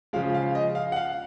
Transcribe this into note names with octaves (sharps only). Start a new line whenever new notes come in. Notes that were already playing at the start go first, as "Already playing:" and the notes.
C#3 F3 G#3 F5
F5
D#5
F5
F#5
F5